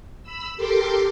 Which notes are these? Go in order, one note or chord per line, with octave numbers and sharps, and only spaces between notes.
B5 E6
G4 A4 A#4 C6 D6